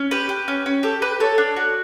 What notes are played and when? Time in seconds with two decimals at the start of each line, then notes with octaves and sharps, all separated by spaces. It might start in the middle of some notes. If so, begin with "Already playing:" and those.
Already playing: C#4
0.11 G4 B4
0.29 G4
0.48 C#4
0.66 C#4
0.83 G4 A4
1.02 G4 B4
1.20 A4 C#5
1.38 D4
1.56 F#4